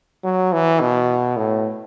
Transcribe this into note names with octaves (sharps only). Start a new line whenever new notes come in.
F#3
E3
B2
A2